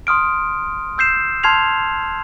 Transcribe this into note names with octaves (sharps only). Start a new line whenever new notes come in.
C6 D#6 F6 D7
E6 G6 C7 E7
A5 C6 F6 G#6 C7 F7